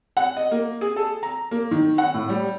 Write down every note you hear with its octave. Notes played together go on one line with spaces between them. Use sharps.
F#5
D#5
A#3
G#4
A4
A#5
A#3
D#3
F#5
A2
G3